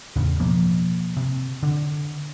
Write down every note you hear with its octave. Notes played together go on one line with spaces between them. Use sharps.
E2 A2 C#3
B2 F3 A#3
C3
D3